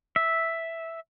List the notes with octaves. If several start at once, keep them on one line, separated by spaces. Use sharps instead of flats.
E5